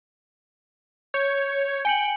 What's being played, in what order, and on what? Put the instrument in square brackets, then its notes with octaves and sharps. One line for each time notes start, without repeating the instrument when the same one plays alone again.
[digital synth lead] C#5 [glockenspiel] G6
[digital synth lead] G5 [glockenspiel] G#5 C#7 F#7